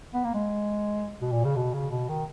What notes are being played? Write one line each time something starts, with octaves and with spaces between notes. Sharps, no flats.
B3
A#3
G#3
B2
A#2
C#3
B2
C#3
B2
D#3